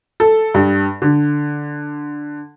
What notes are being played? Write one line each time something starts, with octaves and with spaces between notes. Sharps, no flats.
A4
G2
D3